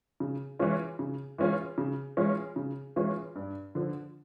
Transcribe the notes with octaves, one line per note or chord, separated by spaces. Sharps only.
C#3
E3 G#3 C#4 F4
C#3
E3 G#3 C#4 F4
C#3
E3 G#3 C#4 F4
C#3
E3 G#3 C#4 F4
G2
D3 F3